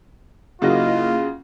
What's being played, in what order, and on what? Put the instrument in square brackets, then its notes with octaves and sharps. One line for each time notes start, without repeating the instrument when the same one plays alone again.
[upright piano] C#3 F#3 [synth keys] A#3 E4 D#5 [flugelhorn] F4